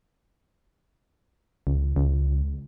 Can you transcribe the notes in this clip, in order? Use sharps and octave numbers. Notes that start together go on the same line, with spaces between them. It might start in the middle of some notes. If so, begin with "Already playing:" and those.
C#2
C#2